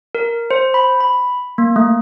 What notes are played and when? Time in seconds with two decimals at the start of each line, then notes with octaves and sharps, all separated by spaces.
0.15 A#4
0.51 C5
0.74 B5
1.00 B5
1.58 A#3
1.76 A3